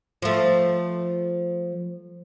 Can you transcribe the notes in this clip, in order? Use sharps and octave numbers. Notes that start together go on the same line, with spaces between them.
F3 A3